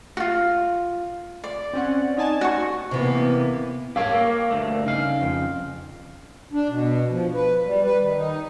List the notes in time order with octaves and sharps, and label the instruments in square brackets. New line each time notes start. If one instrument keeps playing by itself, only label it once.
[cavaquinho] F4 F#4
D5
[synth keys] C4 C#4 F#5
D#4 G#5 A5
[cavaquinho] F#4 C#6
[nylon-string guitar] C3 E3 [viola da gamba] A#3 B3
[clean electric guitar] G4 A4 C#5 [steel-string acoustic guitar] A#4 F5
[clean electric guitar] A#3
D2 G2 A3
[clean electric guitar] C#3 F5 [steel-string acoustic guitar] D#4
[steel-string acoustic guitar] F2 G5
[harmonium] D4
B2
F3
B4
G3
B4
D#3
D#4